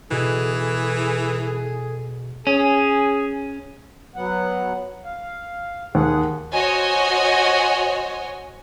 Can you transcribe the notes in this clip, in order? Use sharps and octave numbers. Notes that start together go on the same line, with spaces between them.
B2 E3 G#4 A4
C#4 G#4
F#3 B3 F#5
F5
D#2 G#4 F#5
F#4 C5 C#5 D#5 G#5